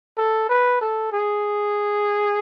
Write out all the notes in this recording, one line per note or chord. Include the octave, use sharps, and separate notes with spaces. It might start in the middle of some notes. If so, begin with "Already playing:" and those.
A4
B4
A4
G#4